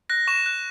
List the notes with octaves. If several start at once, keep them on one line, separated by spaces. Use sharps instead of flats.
F#6 A#6
C#6 E7
F#6